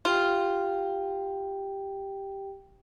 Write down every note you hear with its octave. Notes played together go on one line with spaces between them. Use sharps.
F4 G4 G5